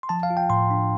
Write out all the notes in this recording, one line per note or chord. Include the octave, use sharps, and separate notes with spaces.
C6
F3 A5
F5
F4
G5
A2 C6
D4